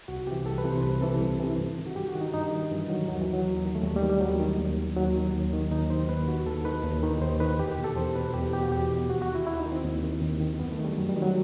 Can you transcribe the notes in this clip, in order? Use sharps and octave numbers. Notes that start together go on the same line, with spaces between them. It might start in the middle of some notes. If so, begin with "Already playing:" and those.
C2 F#4
C3 E3 G4
C2 A4
B4
C3 E3
C5
C2 B4
C3 E3 A4
C2
C3 E3
G2
D#3
F#4
G2 G4
F#4
D#3
D#4
G2 D#4
D#3
G2 E3
D#3 F#3
D#2 F#3
E3
D#3
F#3
D#2
D#3
A3
D#2 G3
G3
D#3
G3
D#2 F#3
D#3
D#2
D#3
D#2 F#3
D#3
D#2
D#3
D#2 D#4
D#3 C5
D#2 B4
D#3 F#4
D#2 A4
D#3 B4
D#2
D#3
D#2 C5
D#3 B4
E2 G4
G4
B2
A4
E2 C5
B2 B4
E2 G4
B2 G4
F#4
E2 G4
B2
D#2 F#4
F#4
D#3
E4
D#2 E4
D#4
D#3
C4
D#2
D#3
D#2
D#3
F#2 B3
A3
D#3
G3
F#2 F#3
G3
D#3
F#3